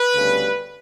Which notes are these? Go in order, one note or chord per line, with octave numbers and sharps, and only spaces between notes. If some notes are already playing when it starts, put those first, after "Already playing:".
Already playing: B4
D2 C#3 G3 B3